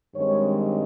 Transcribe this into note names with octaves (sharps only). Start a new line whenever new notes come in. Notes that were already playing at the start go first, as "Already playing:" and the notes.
G2 D#3 G#3 C4 C#5